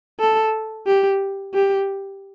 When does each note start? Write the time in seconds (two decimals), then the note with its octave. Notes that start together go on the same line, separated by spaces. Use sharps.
0.20 A4
0.87 G4
1.54 G4